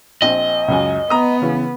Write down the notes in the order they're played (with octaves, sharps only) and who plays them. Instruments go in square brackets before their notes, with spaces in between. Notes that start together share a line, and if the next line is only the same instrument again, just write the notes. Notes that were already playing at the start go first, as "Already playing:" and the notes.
[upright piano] A#1 C4 [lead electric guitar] D#5
[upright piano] C#2 F#2 G#5
[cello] B3 [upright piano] A#5 D#6
[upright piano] C#3 E3